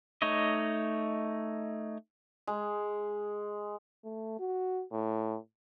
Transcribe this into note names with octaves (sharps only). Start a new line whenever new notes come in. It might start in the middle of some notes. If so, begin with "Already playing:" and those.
A3 D#4 C#5 D#5
G#3
A3
F#4
A2